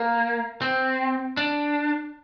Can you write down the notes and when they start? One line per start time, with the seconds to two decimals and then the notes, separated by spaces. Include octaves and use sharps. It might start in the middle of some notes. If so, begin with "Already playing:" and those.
Already playing: A#3
0.62 C4
1.37 D4